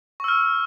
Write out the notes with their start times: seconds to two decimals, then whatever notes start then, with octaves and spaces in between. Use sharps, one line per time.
0.20 C#6
0.24 E6
0.28 F6